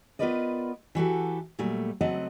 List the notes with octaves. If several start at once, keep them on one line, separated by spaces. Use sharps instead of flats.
B3 F4 A#4 B4 D5 D#5
E3 F#4 G4 A4
A#2 F#3 G3 A3
C#3 F#3 A3 C4 D#5 F#5